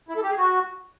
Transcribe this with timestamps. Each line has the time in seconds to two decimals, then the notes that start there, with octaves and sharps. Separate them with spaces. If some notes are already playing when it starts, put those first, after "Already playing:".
0.09 E4
0.16 A4
0.23 G4
0.31 G#4
0.38 F#4